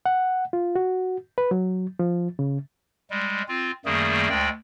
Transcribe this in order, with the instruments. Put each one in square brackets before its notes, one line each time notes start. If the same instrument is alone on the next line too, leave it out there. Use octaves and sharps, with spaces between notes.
[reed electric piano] F#5
F4
F#4
B4
F#3
F3
C#3
[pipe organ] G3 G#3
C4 F4
F#2 D#3 G3 A3 A#3 G#4
D2 G#3 D5 G5